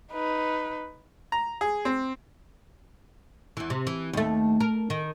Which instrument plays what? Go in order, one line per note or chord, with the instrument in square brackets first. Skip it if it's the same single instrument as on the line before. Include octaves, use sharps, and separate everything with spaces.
[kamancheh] D#4 B4
[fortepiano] A#5
G#4
C4
[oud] E2 E3
C3
E3
D#2 A3
A#4
D#3